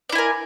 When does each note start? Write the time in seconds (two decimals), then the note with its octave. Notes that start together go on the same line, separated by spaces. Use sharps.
0.09 D5
0.12 E4
0.15 G#5
0.18 A#4